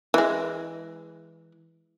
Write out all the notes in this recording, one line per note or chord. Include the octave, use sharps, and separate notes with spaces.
E3 G#3